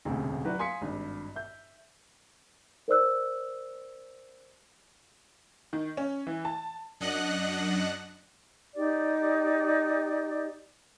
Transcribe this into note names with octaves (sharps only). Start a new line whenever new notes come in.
E1 A1 D2 C3
F#3 E4 F#4 G4 B4 D5
F5 G#5 C6 D#6 B6 C#7
G#1 G2
E5 G6
A#4 C5 D5 E6 F#6
D#3
C#4
E3
A5
F#2 D4 D#5 F#5 F#6
D#4 G4 D5